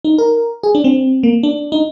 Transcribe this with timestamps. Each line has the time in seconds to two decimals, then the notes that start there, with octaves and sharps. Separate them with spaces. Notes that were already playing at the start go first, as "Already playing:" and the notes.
0.04 D#4
0.18 A#4
0.63 G#4
0.75 D4
0.84 C4
1.23 A#3
1.43 D4
1.72 D#4